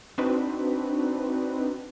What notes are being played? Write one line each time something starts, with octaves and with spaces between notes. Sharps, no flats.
C4 D4 D#4 F#4 B4